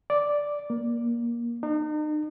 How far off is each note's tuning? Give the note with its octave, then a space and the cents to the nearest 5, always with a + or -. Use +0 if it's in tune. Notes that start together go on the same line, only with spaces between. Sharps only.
D5 -5
A#3 +20
D#4 -40